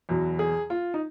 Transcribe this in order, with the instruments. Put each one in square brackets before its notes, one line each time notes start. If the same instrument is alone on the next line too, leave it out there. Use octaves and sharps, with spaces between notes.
[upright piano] E2 B2 F#3
[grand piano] G#4
F4
D#4